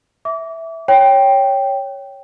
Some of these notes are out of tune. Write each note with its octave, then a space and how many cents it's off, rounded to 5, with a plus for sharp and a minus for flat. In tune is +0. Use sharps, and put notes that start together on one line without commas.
E5 -5 D6 -30
C#5 +0 G5 +0